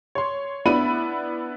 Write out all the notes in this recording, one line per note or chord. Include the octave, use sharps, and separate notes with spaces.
C#5 C6
B3 D4 E4 B5 D#7